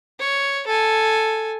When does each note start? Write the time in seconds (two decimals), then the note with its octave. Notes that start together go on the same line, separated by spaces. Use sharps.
0.19 C#5
0.67 A4 G#5